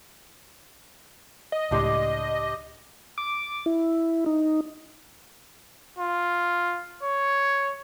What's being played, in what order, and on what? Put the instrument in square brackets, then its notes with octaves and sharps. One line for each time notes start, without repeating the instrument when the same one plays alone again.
[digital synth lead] D#5
[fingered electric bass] C#2 A2 [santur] D4 G4 C6
[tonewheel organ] D6
E4
D#4
[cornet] F4
C#5